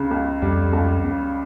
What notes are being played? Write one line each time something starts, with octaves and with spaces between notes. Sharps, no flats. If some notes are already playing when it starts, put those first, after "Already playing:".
Already playing: C#2 C#3
C#2
F2 G3
C#2
C#3